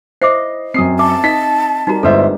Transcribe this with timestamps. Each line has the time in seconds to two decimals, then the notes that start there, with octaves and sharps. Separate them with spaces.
0.22 E4 C5 D#5 E5 D6 C7
0.74 F#2 C4 D#6 C7
0.99 E5 A5 D6
1.24 D#4 D#5 B6
1.87 G3 D#4 F#4 G4 A#4 A#5
2.03 G1 G#3 D4 A4 B4 C5 D#5 E5